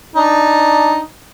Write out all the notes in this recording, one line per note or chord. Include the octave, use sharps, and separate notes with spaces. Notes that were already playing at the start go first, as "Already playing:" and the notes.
D4 D#4